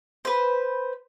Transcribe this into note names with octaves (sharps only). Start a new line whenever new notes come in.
B4 C5